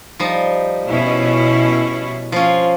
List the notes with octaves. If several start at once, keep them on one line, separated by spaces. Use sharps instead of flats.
F3 G3 D#4
B2 C#4 E4
F3 C#4 F4